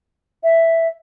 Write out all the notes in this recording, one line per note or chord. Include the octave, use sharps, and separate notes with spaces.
E5